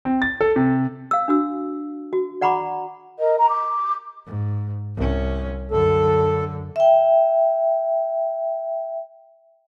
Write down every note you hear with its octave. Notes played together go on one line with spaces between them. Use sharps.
C4
A6
A4
C3
F5 E6
D4 F#4 E6
F#4
D5 F#5 A#5 B5 C#6 D6
A#4 D#5
A#5
D6
G#2
C2 C#4
F#2 D3 A4
E5 G5